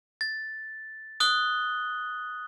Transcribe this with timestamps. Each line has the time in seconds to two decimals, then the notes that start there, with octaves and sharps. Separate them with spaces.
0.21 A6
1.20 D#6 F#6 G7